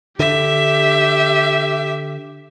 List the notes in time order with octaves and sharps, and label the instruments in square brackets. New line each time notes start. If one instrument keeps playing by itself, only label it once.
[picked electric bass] D3 [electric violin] G4 [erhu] E5